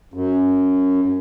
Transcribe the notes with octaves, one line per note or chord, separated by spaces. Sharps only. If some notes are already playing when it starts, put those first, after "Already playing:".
F#2